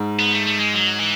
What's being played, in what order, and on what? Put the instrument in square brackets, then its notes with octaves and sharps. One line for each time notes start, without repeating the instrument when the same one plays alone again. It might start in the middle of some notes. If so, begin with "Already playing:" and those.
Already playing: [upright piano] G#2
[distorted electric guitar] B3
A3
A3
G#3
F#3
E3